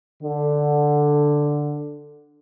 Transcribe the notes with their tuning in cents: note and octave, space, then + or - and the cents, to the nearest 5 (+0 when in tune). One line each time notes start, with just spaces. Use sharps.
D3 +5